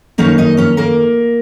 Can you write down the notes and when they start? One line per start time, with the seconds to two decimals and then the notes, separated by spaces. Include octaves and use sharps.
0.18 F#2 D#3 A#3 C#4 D#4 C#5
0.38 D#4 D#5
0.57 C#4 C#5
0.77 A#3 A#4